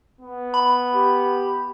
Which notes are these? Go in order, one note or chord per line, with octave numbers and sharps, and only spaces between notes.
B3
B5
G4